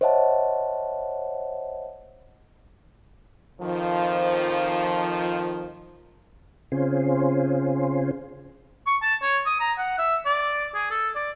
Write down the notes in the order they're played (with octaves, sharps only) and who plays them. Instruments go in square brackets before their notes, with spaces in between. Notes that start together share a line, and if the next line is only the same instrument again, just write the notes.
[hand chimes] C5 C#5 D#5 E5 F#5 A5
[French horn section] F2 D#3 F3
[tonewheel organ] C#3 C4 C#4 F4 G#4 C5
[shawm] C#6
A5
C#5
D#6
A#5
F#5
E5
D5
G#4
A4
D5